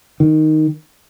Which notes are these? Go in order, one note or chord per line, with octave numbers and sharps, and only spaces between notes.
D#3